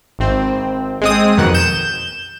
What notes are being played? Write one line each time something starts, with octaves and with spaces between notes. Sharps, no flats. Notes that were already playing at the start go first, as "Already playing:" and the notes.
G#1 C4
G#3 C4 D#6
B1 F2 B2 D#3 F#5
G6 E7